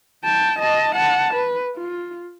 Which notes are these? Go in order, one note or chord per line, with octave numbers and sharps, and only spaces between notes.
G5 A5
D#5 A5
F#5 A5
B4
F4